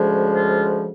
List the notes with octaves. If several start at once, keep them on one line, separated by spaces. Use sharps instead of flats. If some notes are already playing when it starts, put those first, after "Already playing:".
Already playing: D2 C#3 F3 G#3
F4